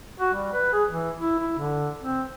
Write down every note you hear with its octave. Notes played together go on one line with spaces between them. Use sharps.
F#4
G3
B4
G#4
E3
E4
E4
D3
C4